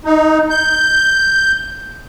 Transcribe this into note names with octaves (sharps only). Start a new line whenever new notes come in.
D#4
G6